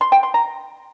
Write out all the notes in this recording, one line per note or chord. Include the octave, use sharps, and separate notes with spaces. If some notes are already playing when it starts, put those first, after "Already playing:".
C6
G5
C6
A#5